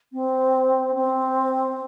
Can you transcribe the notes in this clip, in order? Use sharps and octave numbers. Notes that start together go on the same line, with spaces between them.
C4
C4